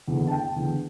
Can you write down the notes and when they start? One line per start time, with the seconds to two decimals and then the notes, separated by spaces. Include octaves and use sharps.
0.08 E2 D3
0.27 A5
0.31 G5
0.56 E2 D3